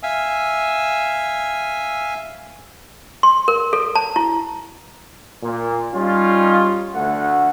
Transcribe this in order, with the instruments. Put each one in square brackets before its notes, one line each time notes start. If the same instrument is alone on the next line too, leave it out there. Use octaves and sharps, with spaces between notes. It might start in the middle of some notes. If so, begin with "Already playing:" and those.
[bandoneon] E5 F5 G#5 E6
[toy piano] C6
A#4
A4
A5
E4
[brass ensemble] A#2
G3 C#4 D#4 F4
D2 A3 F#5